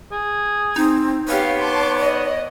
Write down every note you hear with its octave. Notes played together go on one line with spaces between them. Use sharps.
G#4
C4 D#4
B3 G4 C#5 F5
A5 C6 D6
D5 D#5